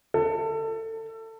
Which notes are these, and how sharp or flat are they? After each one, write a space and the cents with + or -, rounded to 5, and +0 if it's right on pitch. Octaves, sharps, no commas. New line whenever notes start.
A4 +25